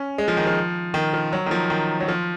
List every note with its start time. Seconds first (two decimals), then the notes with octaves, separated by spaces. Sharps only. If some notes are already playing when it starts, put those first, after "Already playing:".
Already playing: C#4
0.18 G#3
0.28 F3
0.37 D#3
0.47 F3
0.94 D#3
1.13 F3
1.33 F#3
1.46 D#3
1.51 F3
1.70 D#3
2.00 F#3
2.08 F3